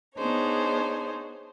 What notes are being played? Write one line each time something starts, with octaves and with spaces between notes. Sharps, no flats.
B3 D4 D#4 G#4 C5 C#5